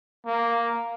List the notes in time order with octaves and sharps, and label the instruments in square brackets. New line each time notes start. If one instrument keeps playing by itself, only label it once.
[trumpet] A#3